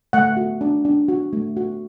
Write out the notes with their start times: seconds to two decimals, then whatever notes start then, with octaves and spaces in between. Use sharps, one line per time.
0.13 A3 F#5
0.37 F#4
0.61 D4
0.85 D4
1.08 F#4
1.33 A3
1.57 F#4